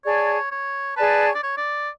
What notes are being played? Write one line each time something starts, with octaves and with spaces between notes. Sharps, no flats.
G#4 C#5 D5 A5
C#5
G#4 B4 D5 A5
C#5
D5
C#5
D5